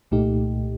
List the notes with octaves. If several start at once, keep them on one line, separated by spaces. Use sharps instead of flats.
C2 A#2 A3 D#4 G4